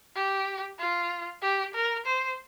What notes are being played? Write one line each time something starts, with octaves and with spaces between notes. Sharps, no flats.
G4
F4
G4
A#4
C5